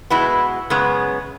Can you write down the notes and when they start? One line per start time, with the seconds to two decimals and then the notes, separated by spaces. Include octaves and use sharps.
0.10 B2 G#3 B3 E4
0.70 F#2 C#3 G#3 B3